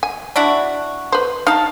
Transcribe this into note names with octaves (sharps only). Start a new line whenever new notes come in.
G#5
D4 E4 F#4
B4 C5
D#4 F5 A5